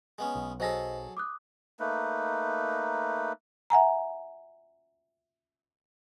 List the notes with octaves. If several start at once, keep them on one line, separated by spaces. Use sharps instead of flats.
G#3 B3 C#4
B1
F#3 G#4 A4 C5 D#5 A#6
D6 D#6 F#6
A3 A#3 D#4 B4
E5 F#5 G#5 A#5